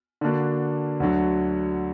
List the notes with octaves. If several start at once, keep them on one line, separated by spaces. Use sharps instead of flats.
D3 A#3 D4 F#4
D2 D3 F#3